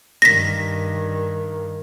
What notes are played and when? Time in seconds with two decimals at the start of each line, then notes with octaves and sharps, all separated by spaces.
0.22 G2 D#3 A#6 B6